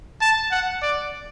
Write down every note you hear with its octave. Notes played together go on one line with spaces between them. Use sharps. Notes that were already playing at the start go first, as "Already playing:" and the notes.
A5
F#5
D5